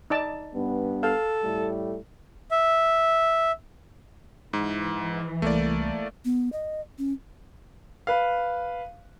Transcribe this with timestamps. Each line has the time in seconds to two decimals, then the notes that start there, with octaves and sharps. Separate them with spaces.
0.10 D#4 D5 A5
0.54 G2 B3
1.03 A4 F5
1.44 A2 G3 A3
2.51 E5
4.53 G#2 E3
5.42 C2 A3 A#3 D5
6.25 B3
6.52 D#5
6.98 C#4
8.07 B4 F5